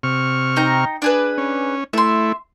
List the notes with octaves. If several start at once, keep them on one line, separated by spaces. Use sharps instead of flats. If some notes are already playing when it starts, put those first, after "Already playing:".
C3 C#6 F6
D#4 G5 A#5
D4 G#4 B4
C#4
A3 E4 E5 C6